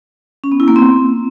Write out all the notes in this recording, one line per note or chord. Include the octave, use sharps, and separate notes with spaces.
C#4
B3
E4
A#3
C4